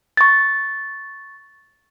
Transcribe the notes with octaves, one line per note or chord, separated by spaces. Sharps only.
C#6 A6